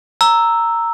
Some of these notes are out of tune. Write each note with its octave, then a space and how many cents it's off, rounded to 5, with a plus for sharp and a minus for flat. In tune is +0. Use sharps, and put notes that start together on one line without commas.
A#5 -10 E6 +0